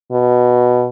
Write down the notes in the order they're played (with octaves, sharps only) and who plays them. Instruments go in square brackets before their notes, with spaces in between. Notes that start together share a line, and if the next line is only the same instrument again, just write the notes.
[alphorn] B2